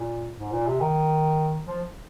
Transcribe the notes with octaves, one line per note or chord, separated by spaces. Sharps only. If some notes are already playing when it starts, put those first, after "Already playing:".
Already playing: A#2
G#2
A#2
C3
D#3
F3